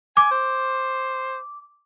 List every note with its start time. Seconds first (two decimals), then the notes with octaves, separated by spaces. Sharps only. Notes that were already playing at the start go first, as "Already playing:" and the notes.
0.17 G#5 D6
0.31 C5